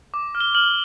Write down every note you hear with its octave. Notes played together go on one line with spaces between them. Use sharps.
D6
F6
G7
F6 F#7